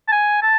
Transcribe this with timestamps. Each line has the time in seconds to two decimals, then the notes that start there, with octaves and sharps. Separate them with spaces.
0.08 A5
0.12 G#5
0.43 A5